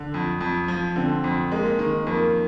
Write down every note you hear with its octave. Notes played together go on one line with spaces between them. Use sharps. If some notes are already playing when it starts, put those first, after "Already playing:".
Already playing: D3
F2
F2
F3
D3 C4
F2
G#3 A#3
D#3
F2 A#3